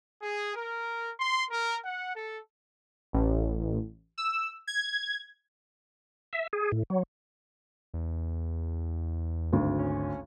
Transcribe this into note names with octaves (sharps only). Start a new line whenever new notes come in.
G#4
A#4
C6
A#4
F#5
A4
A1
E6
G#6
E5
G#4
A2
F#3
E2
G#1 D2
C#4